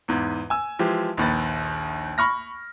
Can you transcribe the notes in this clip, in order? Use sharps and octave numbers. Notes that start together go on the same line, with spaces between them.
E2 G#2
G#5 E6
E3 F3 G#3 G4
A#1 D#2 B4 A6
B5 C#6 F6 A#6